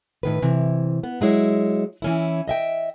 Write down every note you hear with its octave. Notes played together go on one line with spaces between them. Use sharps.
A2 D#3 B4
C3 E3
B3
F#3 G#3 E4 C#5
E3 C#4 E4
D#5 E5 G5